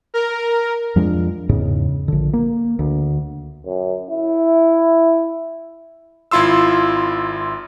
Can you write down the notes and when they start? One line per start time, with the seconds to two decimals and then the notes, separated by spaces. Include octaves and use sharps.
0.14 A#4
0.96 F2 F3 G#3 D4
1.49 E2 G#2 C#3
2.08 A#1 D3
2.33 A#3
2.79 D2
3.66 F#2
4.09 E4
6.31 G#1 E4 F4 C6 E6